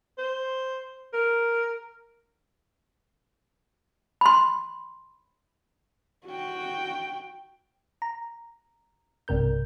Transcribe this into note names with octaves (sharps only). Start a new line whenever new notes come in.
C5
A#4
B5 C6
F#4 G5
A#5
B1 G2 C3 A#4 G6